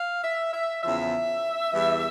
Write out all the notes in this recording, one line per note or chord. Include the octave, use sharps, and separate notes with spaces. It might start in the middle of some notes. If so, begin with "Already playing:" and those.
Already playing: F5
E5
E5
E2 C#3 F3 E5
E2 E3 G3